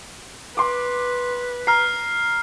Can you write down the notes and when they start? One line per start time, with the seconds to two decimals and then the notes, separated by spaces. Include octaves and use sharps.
0.57 B4 C6 D6
1.67 A#5 F6 C7